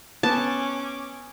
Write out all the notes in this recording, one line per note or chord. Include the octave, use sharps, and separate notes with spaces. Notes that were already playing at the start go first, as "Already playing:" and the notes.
B3 C#4 A5 D6